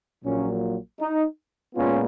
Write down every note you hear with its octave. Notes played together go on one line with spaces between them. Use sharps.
A#1 A#2 F#3 A#3 C#4
D#4
A#2 G#3 B3 C#4 F4